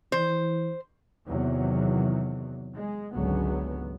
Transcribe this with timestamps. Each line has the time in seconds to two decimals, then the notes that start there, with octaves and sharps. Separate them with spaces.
0.12 E3 C5
1.28 E2 C3 D#3 F#3
2.74 G#3
3.13 G#1 C#2 D3 F#3 B3